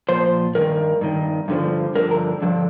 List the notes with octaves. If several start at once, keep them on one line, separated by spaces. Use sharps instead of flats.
A#2 F3 C5
G2 D#3 A#4
G2 D#3
G2 D3 F3
G2 D3 F3 A#4
A#4
G2 D3 F3